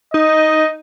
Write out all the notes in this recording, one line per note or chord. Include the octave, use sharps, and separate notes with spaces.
D#4 D#5